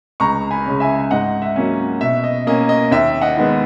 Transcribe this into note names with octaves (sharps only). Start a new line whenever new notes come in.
C#2 A#5 C#6
G#5 B5
C#3 G#3 C#4
E5 G#5
G#2 D#5 F#5
E5
F#3 A#3 C#4
B2 E5
D#5
A#3 C#4 D#5
D#5
D#2 E5
D#5 F#5
D#3 G#3 B3